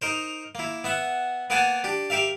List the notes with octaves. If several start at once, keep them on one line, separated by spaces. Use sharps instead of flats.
D#4 A#4 C5
A#3 E4
B3 E5 F#5
A#3 B3 A#4 F#5 G#5 A5
D4 G4
G4 A#4 E5 F5